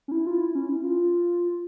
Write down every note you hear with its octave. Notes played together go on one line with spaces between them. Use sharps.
C#4
E4
F4
E4
C#4
E4
F4